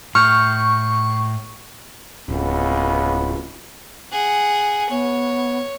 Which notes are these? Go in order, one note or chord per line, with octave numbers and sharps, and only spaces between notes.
A2 C#6 F6 G6
D1 C#2 B3
G#4 F#5
B3 C#5